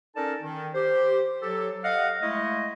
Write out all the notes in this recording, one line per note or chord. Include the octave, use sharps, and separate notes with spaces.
C#4 D#4 A4 A#4 D5 A5
D#3
G4 C5
F#3 G4 A4
D#5 F5 F#5
G#3 A3 E4 D#5